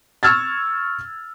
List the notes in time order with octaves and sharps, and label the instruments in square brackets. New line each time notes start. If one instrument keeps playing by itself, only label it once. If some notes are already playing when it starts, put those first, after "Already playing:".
[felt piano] C#6 E6 F6 G#6 A6